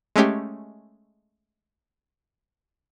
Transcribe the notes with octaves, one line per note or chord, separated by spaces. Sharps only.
G#3 A3 C#4 G4